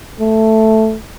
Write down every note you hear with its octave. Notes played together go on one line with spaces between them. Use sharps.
A3